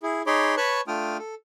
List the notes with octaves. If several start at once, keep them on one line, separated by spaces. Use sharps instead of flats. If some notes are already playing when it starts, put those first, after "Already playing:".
E4 G#4
D#4 G#4 C#5 B5 C6 D6
B4 C#5 A5 B5 C#6 F#6
A3 D4 F4 G5 D#6 F6
A4